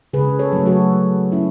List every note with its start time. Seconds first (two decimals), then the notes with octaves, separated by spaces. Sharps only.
0.13 C#3 G#4 B4
0.39 A4 C#5
0.53 F#3 A3
0.66 F#4 A4
0.92 F#3
1.32 C#4 E4